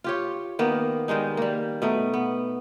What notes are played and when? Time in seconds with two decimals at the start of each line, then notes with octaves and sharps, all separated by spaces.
0.04 F4 G4 C#5
0.59 D#3 A#3 B3
1.08 D#3 G3 G#3 D#4
1.37 G3 A#3
1.82 B2 A3 D#4
2.14 B3